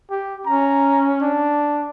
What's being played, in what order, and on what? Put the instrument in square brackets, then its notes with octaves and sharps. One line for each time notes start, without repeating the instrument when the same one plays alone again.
[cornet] G4
[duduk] C#4 [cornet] A#5
[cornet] D4